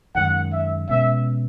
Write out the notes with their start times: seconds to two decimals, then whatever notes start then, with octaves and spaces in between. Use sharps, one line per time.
0.15 F#2 D#3 G#3 F#5
0.52 E5
0.89 B2 G#3 C#4 E5